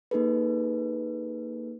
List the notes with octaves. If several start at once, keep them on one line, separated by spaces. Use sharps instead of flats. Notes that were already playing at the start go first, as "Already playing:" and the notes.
A#3 D#4 G#4 A4 B4